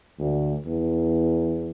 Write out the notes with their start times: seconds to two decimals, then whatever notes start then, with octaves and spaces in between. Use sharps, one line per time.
0.19 D2
0.66 E2